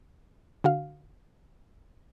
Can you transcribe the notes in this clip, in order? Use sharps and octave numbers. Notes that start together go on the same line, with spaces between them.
D3 F#4 F5